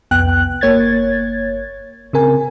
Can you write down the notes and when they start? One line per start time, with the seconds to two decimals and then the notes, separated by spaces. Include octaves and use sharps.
0.11 C2 F2 B3 G5 F#6
0.61 G1 A#3 C#5 G#6 A6
2.13 C#3 C4 A#4 G#5